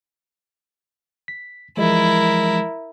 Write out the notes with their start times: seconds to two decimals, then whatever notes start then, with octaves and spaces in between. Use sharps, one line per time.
1.28 B6
1.77 E3 F3 G#3 E4 A#4